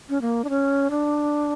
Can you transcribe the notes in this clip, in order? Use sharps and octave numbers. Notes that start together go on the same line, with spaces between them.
C#4
A#3
D4
C#4
D4